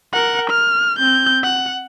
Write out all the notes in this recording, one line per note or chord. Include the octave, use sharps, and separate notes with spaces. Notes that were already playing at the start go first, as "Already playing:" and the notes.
A#4 F#5
F6
C4 G6
F#5